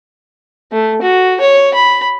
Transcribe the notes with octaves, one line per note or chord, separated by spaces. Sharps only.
A3
F#4
C#5
B5